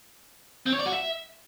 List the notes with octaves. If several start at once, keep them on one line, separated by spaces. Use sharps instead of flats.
C4
C#5
D5
F#4
E5